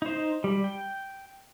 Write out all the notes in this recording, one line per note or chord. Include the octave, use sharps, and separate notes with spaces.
D#4 C5
G3
G5